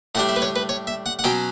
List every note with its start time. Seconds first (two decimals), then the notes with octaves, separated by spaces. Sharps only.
0.15 A2 G3 D4 F#5
0.29 E5
0.36 B4
0.42 C#5
0.56 B4
0.69 C#5
0.87 E5
1.06 F#5
1.19 F#5
1.24 B2 F#3 C#4 G5